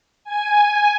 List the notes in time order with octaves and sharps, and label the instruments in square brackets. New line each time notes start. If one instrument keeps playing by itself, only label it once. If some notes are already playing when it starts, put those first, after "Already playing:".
[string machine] G#5